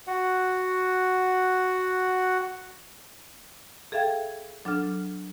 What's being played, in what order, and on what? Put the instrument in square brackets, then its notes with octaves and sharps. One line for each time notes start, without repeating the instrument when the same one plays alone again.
[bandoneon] F#4 F#5
[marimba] G#4 A4 E5 F5 G5 G#6
F#3 D4 A4 F6